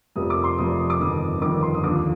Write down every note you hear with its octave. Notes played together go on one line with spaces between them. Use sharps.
F1 F2 C3 F3 A#3 D#6
D6
C6
F1 F2 C3 F3 A#3 D#6
D#6
D6
G1 F2 D#3 D#6
G1 F2 D#3 D6
C6
D#6
D#2 D3 F3 D6